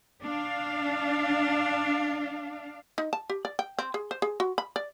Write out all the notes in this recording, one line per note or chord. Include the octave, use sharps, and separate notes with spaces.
D4 F5
D#4
A5
G4
D5
G5
C4
G#4
C5
G#4
F#4
B5
D5